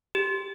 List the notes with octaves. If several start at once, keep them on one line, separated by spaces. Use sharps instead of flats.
G4